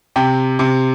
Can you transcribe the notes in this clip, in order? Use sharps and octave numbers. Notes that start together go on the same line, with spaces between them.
C3 G5
C3